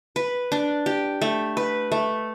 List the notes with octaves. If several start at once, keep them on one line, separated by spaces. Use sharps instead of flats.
B4
D4
G4
A3
B4
A3